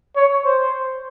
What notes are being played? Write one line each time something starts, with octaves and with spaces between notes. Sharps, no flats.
C#5
C5